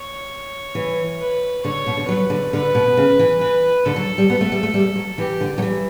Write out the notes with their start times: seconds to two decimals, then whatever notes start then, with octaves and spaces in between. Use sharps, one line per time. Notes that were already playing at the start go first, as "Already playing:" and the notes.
Already playing: C#5
0.75 E3
1.20 B4
1.65 D3 C#5
1.86 B2
1.97 D3
2.08 F#3 B4
2.30 D3
2.53 D3 B4
2.75 B2
2.97 C#3
3.19 E3
3.41 E3 B4
3.85 D3 A4
3.96 F#3
4.18 G3
4.30 B3
4.41 A3
4.52 G3
4.63 A3
4.74 G3
4.95 F#3
5.18 E3 G4
5.41 D3
5.58 F#3
5.62 E3